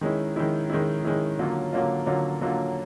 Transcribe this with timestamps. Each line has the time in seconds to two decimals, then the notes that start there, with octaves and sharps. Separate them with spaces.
0.01 D#3 G#3 C#4 E4
0.36 D#3 G#3 C#4 E4
0.70 D#3 G#3 C#4 E4
1.04 D#3 G#3 C#4 E4
1.39 D3 F#3 A#3 C#4 F4
1.73 D3 F#3 A#3 C#4 F4
2.06 D3 F#3 A#3 C#4 F4
2.41 D3 F#3 A#3 C#4 F4